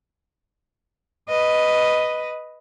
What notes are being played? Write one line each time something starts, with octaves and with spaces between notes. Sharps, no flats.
B4 D#5